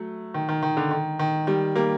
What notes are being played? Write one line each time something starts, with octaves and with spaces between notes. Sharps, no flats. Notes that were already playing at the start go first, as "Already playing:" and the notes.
Already playing: F#3 A3
D#3
D#3
D#3
D3
D#3
D#3
D#3 G3
G3 A#3